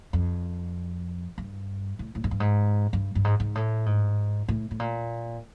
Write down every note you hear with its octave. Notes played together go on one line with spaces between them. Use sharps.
F2
G2
A2
A2
G#2
G2
G#2
G2
G2
G#2
G#2
A2
G#2
A2
A2
A#2